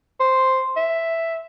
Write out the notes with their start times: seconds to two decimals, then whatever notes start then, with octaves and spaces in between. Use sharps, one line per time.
0.20 C5
0.76 E5